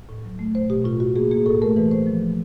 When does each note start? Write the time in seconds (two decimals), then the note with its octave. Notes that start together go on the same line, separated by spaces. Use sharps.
0.09 A2
0.25 F#3
0.39 A3
0.55 B2 C5
0.70 B2 G4
0.85 A2 F4
1.00 A2 F#4
1.16 A#3 G#4
1.31 A#3 G#4
1.46 A2 A4
1.62 A3 A#4
1.76 E3 B4
1.91 A2 C5
2.07 F3
2.22 F3